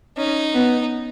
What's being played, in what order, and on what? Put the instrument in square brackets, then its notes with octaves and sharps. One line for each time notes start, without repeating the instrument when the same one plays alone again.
[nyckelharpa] C#4 [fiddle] D#4
[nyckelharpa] B3